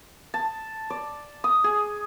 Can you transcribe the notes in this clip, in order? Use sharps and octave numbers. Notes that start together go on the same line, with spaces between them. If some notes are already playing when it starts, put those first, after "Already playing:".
A5
D5
D#6
G#4